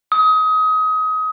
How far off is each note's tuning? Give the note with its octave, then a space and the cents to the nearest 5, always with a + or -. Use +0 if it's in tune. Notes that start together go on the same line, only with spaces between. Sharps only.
D#6 +25